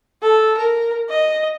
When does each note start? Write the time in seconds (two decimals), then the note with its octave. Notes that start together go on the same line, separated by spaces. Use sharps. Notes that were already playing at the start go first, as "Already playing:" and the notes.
0.22 A4
0.58 A#4
1.09 D#5